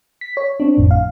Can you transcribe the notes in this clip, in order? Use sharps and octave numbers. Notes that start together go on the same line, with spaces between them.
B6
C#5
C4 D4
G#1 F2 A2
F5